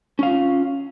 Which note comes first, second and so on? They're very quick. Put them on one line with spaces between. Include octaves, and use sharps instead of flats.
C#4 F5 F4